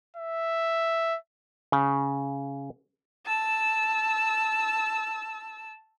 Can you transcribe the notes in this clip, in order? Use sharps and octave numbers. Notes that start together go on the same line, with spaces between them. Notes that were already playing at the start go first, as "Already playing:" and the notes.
E5
C#3
A5 E6